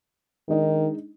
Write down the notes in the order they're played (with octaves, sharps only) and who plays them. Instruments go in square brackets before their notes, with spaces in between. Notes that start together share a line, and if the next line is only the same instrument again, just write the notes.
[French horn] D#3 [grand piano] G#3 D4 D#4